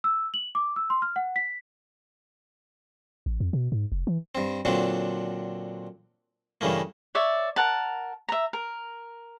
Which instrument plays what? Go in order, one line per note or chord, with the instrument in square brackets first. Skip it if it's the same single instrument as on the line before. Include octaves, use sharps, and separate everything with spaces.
[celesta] E6
F#7
D6
E6
C6
F6
F#5
B6
[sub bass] A1
F2
B2
G#2
F1
E3
[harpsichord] G2 C4
A#2 D3 F#3 C4 D4
G2 C#3 E3 A3 A#3
[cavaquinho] C#5 D5 E5
A#4 F#5 A5
E5 A#5
A#4